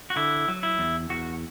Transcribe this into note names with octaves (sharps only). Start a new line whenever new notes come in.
F#4
D3 E4
F#3
E4
E2
E2 F#4